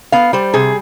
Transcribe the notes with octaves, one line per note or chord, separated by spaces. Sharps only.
B3 F5
G3 C5
C3 G#4